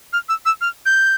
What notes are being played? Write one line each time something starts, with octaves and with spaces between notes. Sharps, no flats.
F6
E6
E6
F6
G6